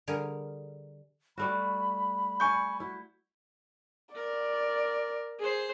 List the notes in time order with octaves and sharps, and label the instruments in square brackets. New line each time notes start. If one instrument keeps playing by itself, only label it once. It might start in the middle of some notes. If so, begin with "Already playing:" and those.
[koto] D3 G3 G#4 A#4
[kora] G3 A3 F#4 [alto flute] B5
[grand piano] G#5 C#6 G6
[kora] E4 [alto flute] F#4
[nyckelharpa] A#4 [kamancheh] D5
[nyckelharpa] G#4 C5